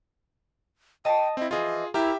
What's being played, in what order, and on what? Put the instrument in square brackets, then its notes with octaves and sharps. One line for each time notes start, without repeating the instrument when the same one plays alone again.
[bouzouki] D#5 A5 [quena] G5
[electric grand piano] C4 E4 [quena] D#5
[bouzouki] E3 F3 [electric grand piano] F4 G#4 [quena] D#5
[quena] E4 [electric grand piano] G4 E5 G5 [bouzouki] A#4